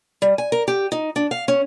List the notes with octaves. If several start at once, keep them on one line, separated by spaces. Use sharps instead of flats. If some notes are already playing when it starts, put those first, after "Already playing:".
G3
G#5
A#4
G4
D#4
D4
F5
C#4